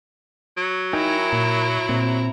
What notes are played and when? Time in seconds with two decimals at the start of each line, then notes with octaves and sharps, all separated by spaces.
0.57 F#3
0.93 D#4 E4 A#4 G5 G#5 A#5
1.33 A#2
1.89 A#2 C4